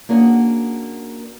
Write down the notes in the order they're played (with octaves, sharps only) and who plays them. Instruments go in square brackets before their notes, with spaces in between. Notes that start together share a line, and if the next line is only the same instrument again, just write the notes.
[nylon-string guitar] A#3 C#4 D4 F#4 G#4 A#4